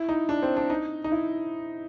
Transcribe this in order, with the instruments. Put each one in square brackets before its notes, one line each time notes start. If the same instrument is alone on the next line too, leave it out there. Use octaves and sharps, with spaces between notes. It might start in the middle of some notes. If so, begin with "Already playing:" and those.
Already playing: [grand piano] E4
D#4
D4
C4
D4
D#4
D#4
E4